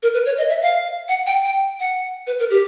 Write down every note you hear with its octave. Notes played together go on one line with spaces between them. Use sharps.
A#4
B4
C#5
D#5
E5
F5
F#5
G5
G5
F#5
B4
A#4
G4